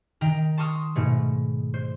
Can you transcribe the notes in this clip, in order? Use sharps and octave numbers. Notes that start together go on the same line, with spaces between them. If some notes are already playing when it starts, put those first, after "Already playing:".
D#3 A#4 G5 A#5
A5 C6 C#6 D#6 F6
G#2 B2 A3
C5